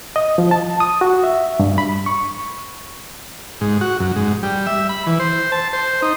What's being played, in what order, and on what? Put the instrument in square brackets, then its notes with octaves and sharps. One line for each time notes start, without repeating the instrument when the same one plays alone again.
[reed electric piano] D#5
F3
A5
D#6
F#4
E5
G2
B5
C#6
[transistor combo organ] G#2
F#4
F#2
G#2
G3
E5
B5
E3
C5
A5
C5
D#4